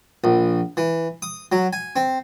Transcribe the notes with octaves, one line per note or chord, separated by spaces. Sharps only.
A#1
E3
D#6
F#3
G#5
C4